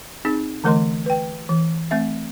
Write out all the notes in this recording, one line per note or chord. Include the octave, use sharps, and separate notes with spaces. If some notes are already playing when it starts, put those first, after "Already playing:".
C4 D#4 G#4
D3 E3 A3 A#4 D#5 C6
B4 G5
E3
A3 C4 E5